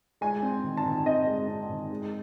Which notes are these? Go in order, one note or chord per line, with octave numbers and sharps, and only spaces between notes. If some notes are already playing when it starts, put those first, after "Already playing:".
G#3 G#5
C4
D#3
A5
D#3
C4 D#5
G#3
C4
D#3
G#3